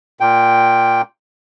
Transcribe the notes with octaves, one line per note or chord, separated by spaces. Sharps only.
A#2 G5